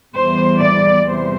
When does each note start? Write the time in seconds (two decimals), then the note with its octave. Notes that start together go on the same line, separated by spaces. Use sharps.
0.16 E2 E3 G3 C5
0.61 D5
1.06 E2 C3 E3 G3 C5